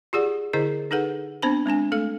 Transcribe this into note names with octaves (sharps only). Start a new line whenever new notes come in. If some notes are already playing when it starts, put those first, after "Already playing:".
F4 G4 G#4 D5 F#5
D3 E4 G#4 C5 D#5
D#4 G#4 A4 B4 F#5
B3 C4 D4 C5 A5 B5
G#3 C4 D4 G#5
A3 A4 F5